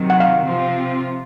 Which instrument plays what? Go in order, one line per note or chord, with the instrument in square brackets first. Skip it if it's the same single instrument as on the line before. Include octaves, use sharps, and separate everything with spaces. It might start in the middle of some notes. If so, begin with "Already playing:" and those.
Already playing: [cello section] C3 D#3 F#3
[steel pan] F#5
F5
[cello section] C3 F3 C4 F4